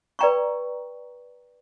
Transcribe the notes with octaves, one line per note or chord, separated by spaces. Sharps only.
B4 D5 G5 A#5 C#6